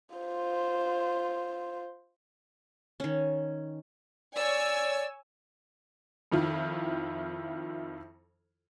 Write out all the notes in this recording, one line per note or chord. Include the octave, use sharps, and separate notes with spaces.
F4 C5
D#3 C#4
C#5 D5 G#5 E6
F2 D#3 E4 F4